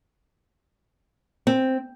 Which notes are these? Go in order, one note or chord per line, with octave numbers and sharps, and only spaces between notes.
C4